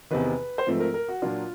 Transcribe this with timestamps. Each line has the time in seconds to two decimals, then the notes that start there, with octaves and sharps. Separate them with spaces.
0.11 E2 C3 D#3 B4
0.58 C5
0.66 G#2 F3 A3 C4 B4
0.80 A#4
0.94 A#4
1.09 F#4
1.22 A#2 F#3 A#3 D4 F4